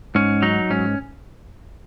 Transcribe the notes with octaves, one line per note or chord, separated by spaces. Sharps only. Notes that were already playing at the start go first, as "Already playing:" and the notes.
G#2 C#4
F#3 D#4
G#2 C#4